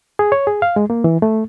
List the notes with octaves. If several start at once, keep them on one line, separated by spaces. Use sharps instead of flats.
G#4
C#5
G#4
F5
G#3
A#3
E3
A3